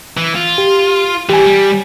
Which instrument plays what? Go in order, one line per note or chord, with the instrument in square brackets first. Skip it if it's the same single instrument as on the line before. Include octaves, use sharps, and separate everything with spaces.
[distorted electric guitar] E3
F4
[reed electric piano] G4
[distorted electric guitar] E3 G3 [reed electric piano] G4 G#5
[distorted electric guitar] G3